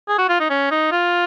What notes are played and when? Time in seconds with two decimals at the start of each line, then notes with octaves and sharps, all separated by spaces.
0.08 G#4
0.18 F#4
0.29 F4
0.40 D#4
0.50 C#4
0.71 D#4
0.92 F4